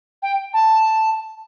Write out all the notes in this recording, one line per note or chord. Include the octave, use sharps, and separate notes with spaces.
G5
A5